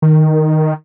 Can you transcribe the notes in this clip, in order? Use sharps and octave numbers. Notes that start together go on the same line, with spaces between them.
D#3